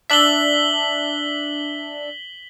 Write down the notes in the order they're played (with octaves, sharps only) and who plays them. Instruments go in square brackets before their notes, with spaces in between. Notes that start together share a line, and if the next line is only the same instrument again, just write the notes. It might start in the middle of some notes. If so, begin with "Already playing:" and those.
[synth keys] D4 E5 [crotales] B6 F#7 G7